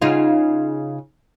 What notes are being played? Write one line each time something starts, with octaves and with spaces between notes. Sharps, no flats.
C#3 D#4 F4